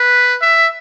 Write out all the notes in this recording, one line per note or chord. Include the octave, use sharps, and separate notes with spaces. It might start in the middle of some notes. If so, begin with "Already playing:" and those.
Already playing: B4
E5